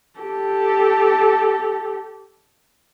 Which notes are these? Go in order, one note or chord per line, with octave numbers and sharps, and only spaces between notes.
G4 A4